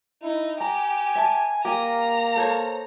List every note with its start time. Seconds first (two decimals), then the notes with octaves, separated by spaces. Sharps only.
0.23 D#4 E4
0.61 G4 G#5 A#5
1.15 E5 A5
1.65 A#3 G4 G#5 A#5
2.36 A4 C5 C#5